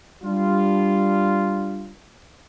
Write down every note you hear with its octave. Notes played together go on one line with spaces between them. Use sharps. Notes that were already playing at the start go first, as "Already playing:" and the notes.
G3 D4 F4